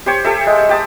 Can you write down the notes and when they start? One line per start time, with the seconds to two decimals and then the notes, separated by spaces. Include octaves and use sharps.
0.06 G4 C5 C#5
0.24 G4 A4 E5
0.47 G#3
0.69 G4 A5 D#6